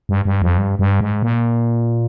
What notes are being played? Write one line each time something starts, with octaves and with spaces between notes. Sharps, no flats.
G2
G2
F2
G2
G2
G#2
A#2